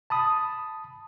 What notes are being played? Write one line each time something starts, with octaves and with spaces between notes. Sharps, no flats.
A5 B5 D#6